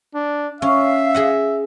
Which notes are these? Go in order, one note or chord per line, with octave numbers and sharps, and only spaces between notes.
D4
C#4 E5 F5
G#4 D#5 F#5